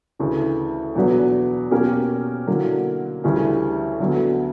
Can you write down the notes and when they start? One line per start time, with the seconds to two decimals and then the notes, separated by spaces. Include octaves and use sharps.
0.19 D2 C#3 E3
0.96 E2 B2 F#3 B3 D4
1.71 B2 A#3 C#4 G4 A#4
2.47 D3 F#3 A#3 E4
3.24 D2 C#3 E3 G3 C#4
4.00 D2 D3 F#3 B3